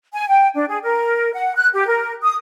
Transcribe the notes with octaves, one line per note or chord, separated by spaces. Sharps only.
G#5
G5
D4
G#4
A#4
F#5
F#6
G4
A#4
D#6